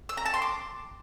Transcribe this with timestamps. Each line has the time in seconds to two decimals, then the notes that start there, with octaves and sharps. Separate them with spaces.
0.09 E6
0.17 A#5
0.25 A5
0.34 C6
0.42 D6